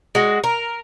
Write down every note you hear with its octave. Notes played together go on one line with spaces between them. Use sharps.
G#3 F#4
A#4